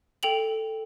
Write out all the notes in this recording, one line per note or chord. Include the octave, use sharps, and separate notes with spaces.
A4 G5 F7 F#7